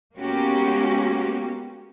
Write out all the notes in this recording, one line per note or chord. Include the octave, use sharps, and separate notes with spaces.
G#3 A#3 B3 C#4 F#4 G4